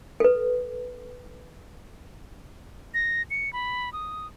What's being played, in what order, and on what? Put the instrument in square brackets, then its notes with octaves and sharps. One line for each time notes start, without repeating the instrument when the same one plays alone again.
[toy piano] A4 B4
[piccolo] A#6
C#7
B5
D#6